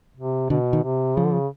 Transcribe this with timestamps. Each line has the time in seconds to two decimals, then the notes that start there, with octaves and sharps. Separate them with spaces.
0.17 C3
0.50 B2 D3
0.73 D#3
0.84 C3
1.16 C#3 F3
1.25 D3
1.32 C#3